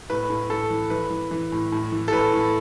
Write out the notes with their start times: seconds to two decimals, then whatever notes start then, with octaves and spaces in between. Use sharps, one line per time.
0.10 A2 B4
0.30 A2
0.50 A2 A4
0.70 E3
0.90 E3 B4
1.10 E3
1.31 E3
1.52 A2
1.72 A2
1.92 E3
2.08 A4
2.12 A2 B4
2.33 A2